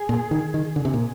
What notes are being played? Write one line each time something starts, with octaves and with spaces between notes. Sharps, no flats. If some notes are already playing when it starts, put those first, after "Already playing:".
Already playing: G#4
A#2
D#3
D#3
D3
C3
A#2